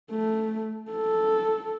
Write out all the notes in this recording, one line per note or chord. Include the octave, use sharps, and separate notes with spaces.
A3
A4